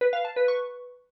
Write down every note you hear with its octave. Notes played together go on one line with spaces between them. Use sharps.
B4
F5
A5
B4
C#6